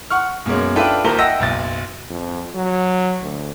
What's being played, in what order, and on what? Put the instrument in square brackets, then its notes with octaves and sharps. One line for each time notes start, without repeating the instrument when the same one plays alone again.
[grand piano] F#5 C#6 F6
F#2 B2 G#3 A#3 C#4
D4 F4 A4 B4 E5 G5
D#1 D#2 A#4 C5 A5 G7
D#5 E5 F#5 G5 E6 A#6
F#1 B1 A6
[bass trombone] F2
F#3
D2